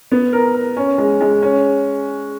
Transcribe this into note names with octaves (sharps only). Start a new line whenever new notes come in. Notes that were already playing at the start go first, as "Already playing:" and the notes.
B3
A#4
A#4
C#4
G#3
G#3
C#4